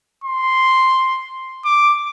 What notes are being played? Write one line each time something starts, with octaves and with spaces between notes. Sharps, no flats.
C6
D6